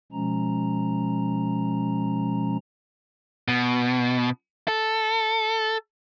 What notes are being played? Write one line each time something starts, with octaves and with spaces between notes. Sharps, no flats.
B2 F3 G#3 C#4 A#5
B2
A4